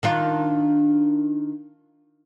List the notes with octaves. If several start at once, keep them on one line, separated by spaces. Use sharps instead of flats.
D#3 D4 F4